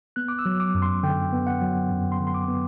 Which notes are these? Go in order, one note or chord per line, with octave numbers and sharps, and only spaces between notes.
B3 F#6
D6
E6
F#3
D6
F#2
C6
D3 G5
B3
F#5
F#3
F#2
C6
D3
C6
D6
B3